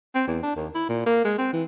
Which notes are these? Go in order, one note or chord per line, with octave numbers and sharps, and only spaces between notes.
C4
E2
D4
D#2
E4
A#2
A#3
G#3
C4
E3